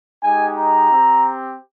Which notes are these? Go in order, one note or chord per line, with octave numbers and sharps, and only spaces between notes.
G#3 D#4 G4 G#5
A#5
C4 G4